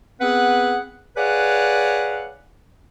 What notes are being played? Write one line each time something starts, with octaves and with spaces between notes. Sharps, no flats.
B3 C4 G#4 B4 F#5
G#4 B4 C#5 D5 F5 F#5